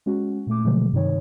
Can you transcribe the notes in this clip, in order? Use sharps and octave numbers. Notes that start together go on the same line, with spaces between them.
G#3 C#4 F#4
A#2 A3 D6
B2 D3 F3 F#3 G#3 A3
G2 C3 D#3 D#4 C#5